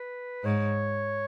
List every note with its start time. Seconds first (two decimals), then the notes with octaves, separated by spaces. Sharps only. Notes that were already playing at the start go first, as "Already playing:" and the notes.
Already playing: B4
0.44 G#2 C#5